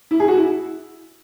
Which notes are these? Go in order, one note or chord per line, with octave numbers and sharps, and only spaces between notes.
E4
G#4
F#4
E4